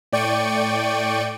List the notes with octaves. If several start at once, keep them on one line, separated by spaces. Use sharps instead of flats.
A2 D5 G5 C#6 C#7 D#7